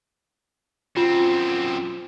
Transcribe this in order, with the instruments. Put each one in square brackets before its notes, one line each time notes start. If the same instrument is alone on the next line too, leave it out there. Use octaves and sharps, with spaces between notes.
[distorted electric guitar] F#2 C4 [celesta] F4